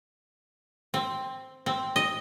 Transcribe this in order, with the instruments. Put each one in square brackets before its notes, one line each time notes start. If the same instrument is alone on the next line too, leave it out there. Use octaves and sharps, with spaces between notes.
[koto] C4
C4
D#5